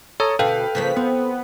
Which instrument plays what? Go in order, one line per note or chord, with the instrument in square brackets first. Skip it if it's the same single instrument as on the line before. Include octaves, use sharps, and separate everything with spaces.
[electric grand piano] A4 [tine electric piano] C#5 A#5 D#6
[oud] D2 B2 [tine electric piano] A4 [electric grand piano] B4 F5 G5
[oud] C#3 F3 A#3 [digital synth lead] B6
[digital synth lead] B3 [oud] C4